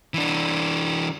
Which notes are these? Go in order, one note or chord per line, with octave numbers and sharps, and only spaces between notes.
E3 D4